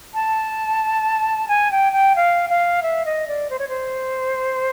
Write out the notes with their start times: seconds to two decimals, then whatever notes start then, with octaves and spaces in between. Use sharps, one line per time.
0.14 A5
1.48 G#5
1.71 G5
1.93 G5
2.16 F5
2.50 F5
2.83 E5
3.05 D#5
3.28 D5
3.50 C5
3.59 C#5
3.69 C5